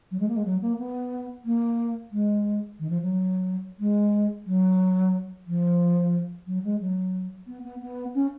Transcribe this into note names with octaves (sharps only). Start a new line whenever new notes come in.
F#3
G#3
A#3
G#3
F#3
A#3
B3
A#3
G#3
D#3
F3
F#3
G#3
F#3
F3
F#3
G#3
F#3
B3
B3
B3
C#4